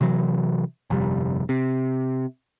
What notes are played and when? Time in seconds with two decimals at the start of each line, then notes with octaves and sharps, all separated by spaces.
0.01 C3 E3 F#3
0.90 G1 F2 C3 G3
1.49 C3